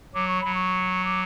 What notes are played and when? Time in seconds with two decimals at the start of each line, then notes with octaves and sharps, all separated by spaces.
0.14 F#3 D6
0.28 C#6
0.41 F#3 B5
0.55 C#6
1.05 D6